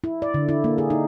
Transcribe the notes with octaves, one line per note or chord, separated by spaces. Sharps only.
E4
D5
D3
E4
A#3
G#4
D#4